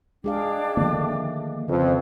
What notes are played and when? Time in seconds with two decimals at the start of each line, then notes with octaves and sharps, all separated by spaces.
0.24 G#3 D4 G#4 F5 G5 D6
0.77 D3 D#3 F3 A3 A#3
1.68 F2 C#3 B4